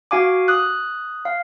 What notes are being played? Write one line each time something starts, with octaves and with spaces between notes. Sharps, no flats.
F#4 F5 G#5 D6
D#6 F#6
F5